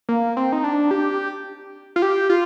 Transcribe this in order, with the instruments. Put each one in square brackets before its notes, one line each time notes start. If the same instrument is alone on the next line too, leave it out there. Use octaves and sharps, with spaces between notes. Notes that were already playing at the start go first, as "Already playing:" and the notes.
[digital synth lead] A#3
C4
D#4
D4
G4
F4
G4
F4